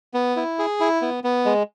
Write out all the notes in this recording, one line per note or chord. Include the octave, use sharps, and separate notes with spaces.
B3
E4
G#4
E4
B3
B3
G#3